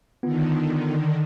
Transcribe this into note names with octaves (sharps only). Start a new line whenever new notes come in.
D3 D#3 B3 F4